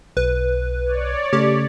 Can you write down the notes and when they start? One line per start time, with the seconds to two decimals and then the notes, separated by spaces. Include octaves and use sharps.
0.17 B1 B4
0.85 C#5 D5
1.33 C#3 A3 G4